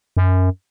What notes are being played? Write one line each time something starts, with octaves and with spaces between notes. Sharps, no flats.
F#2